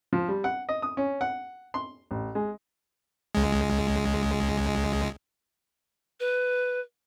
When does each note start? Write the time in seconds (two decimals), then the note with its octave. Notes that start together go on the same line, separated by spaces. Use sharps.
0.13 F3
0.28 G3
0.44 F#5
0.69 D#5
0.82 D#6
0.97 C#4
1.21 F#5
1.74 C6
2.11 A1
2.35 G#3
3.35 C#2 G#3
6.20 B4